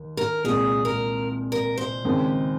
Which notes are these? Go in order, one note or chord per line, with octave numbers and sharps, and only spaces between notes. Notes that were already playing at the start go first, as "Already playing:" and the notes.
Already playing: D#2
A#4
C2 A#2 G#3 G#4
A#4
A#4
C5
D#2 C#3 G#3 C4